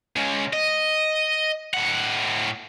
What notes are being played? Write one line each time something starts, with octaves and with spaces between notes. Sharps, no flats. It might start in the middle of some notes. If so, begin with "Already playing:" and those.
C#3 G#3
D#5
A2 F#5